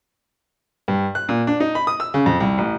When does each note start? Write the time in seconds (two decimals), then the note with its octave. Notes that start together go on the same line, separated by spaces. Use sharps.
0.88 G2
1.15 F#6
1.29 A#2
1.47 D4
1.60 D#4
1.75 B5
1.87 D#6
2.00 E6
2.14 C#3
2.26 F2
2.40 C2
2.58 A1